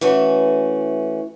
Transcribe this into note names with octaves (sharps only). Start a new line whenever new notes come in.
E3 A3 C#4 F#4